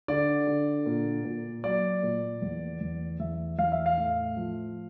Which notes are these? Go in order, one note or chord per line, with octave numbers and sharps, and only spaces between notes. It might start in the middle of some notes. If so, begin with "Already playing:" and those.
D3 D5
D3
A#2
A#2
F#3 D5
A#2
E2
E2
E2 E5
E2 F5
E5
F5
A2
F3